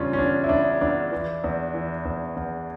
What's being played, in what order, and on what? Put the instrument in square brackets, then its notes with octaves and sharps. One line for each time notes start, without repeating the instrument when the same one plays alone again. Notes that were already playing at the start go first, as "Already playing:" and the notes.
Already playing: [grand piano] E2 C#3 G3 C#4 D4 F4
C#4
E2 D4
E4
E2 D4
E2 D4
E3
E2
E3
E2
E2